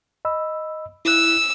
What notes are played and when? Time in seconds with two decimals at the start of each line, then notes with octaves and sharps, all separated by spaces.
0.25 D#5 B5 E6
1.05 E4 E6 F#6